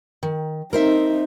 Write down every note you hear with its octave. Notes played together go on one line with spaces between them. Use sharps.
D#3
C4 D#4 A#4 C5 E5